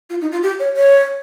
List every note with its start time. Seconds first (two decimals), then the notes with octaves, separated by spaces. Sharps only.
0.10 F4
0.21 D#4
0.32 F4
0.43 G4
0.60 C#5
0.77 C#5